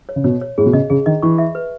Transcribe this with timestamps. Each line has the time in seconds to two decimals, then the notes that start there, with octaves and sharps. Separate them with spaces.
0.09 C#5
0.16 C#3
0.24 B2 C#5
0.42 C#5
0.58 A2 G#4
0.66 B2
0.73 C#3 D#5
0.90 C#3 G#4
1.06 D#3 D#5
1.22 E3 C#6
1.38 E5
1.55 B4